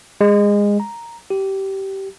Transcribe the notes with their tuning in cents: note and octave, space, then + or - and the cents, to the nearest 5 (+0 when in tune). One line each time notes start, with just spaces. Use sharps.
G#3 -20
A#5 +0
G4 -20